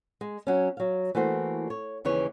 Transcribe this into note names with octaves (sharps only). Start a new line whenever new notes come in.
G#3
F#3 C#4
F#3 F5
E3 A3 A#3 F#4 C5
C#5
D#2 C#3 E3 C#5